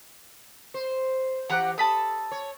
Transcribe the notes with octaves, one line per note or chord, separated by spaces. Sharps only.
C5
E3 G4 F#5 A#5 F#6
A4 A5 B5 D#6
C#5